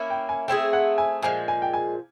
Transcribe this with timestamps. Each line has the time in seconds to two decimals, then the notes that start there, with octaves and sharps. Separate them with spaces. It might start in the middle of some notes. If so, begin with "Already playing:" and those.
Already playing: A#3 C#4 E4
0.10 G5
0.29 G#5
0.48 A3 C4 E4 G#4 G5
0.73 F#5
0.98 G#5
1.23 A#2 F3 G#3 G#5
1.48 G#5
1.62 G5
1.73 G#5